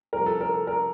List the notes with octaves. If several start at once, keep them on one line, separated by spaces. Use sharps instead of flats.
C2 C3 F3 A#4
A4
A#4
A4
A#4